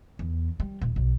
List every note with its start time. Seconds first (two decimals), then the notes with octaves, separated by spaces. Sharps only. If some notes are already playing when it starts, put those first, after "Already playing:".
0.19 E2
0.60 G3
0.81 D#1
0.96 B1